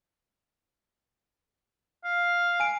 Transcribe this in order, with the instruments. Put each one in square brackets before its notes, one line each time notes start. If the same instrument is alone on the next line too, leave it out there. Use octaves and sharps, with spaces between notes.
[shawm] F5
[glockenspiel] G#5 D7